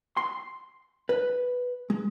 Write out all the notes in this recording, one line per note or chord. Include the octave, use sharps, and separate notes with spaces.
C6
B4
G#3